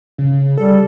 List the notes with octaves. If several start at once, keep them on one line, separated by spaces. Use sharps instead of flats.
C#3
G3 A4